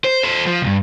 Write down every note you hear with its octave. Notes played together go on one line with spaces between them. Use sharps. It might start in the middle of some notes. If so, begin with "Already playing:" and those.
C5
A4 C5
F3
C#2 G2